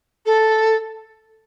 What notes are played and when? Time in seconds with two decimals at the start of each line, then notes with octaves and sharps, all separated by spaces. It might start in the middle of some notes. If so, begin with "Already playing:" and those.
0.25 A4